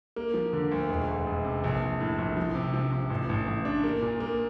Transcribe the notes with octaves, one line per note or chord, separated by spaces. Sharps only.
A#3
F3
D3
D2
E1
D2
E1
C3
A#1
A#1
A2
A#1
F3
C3
F3
C3
A1
A1
A1
D4
A#3
A#2
A#3